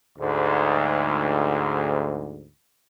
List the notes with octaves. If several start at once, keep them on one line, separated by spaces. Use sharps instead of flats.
D2 G#2